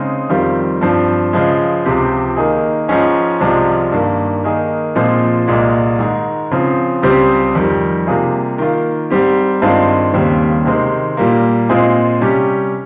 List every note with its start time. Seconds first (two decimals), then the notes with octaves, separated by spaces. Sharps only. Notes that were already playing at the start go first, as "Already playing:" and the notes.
Already playing: C#3 G#3 C4 D#4
0.29 F2 D#3 G3 C4 F4
0.81 G2 F3 C4
1.33 C#3 F3 G#3
1.85 C#2 C3 F3 C4 G4
2.37 D#3 A#3 D#4 G#4
2.88 G#2 F3 G#3 C#4 G#4
3.41 C2 C3 F3 G#3
3.92 G2 D#3 A#3
4.44 D#3 A#3 D#4 G#4
4.95 A#2 F3 G#3 C4
5.47 C2 A#2 G#3
5.99 G#2 D#3 G#3
6.51 C#3 F3 C4
7.02 C#2 C#3 G3 C4 G4
7.55 F2 D#3 G3
8.07 C3 G3 A#3 F4 G#4
8.58 D#3 A#3 F4
9.10 G#2 G3 C4 G4
9.62 G2 D#3 G#3 C4 F4
10.14 D#2 C#3 G3 C4
10.65 C3 D#3 G#3 C4
11.17 A#2 G3 A#3
11.69 A#2 G#3 C4 F4 G#4
12.21 C3 G3 C#4 G4